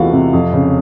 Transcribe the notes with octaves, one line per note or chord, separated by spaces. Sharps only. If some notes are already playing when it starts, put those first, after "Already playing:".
Already playing: E2 C3 E3 A3 F4 F#4 F5 F#5
C3
F2
C#3